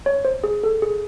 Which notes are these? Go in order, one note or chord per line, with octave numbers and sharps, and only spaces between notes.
C#5
C5
G#4
A4
G#4